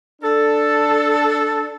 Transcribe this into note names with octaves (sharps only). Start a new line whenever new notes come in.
D4 A4